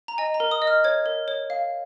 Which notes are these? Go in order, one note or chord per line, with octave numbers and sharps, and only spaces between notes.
A#5
D#5 G#5
A#5
A#4
D#6
D#5
F6
C#5 G#6
A#4
C#5
F5